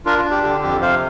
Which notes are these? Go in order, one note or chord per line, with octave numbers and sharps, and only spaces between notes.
D4 F4 A#4
F4
D4
G4
D3 G4
F2 G4
C3 C5 F5